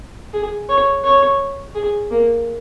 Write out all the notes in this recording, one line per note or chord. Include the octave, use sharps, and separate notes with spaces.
G#4
C#5
C#5
G#4
A#3